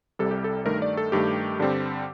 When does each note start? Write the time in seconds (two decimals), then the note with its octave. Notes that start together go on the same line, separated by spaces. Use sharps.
0.19 C2 C3 G3 A4
0.31 G4
0.44 A4
0.66 G2 D#3 A3 A#4
0.82 D5
0.97 A4
1.12 G2 D#3 A3 G4
1.59 G2 D3 G3 C4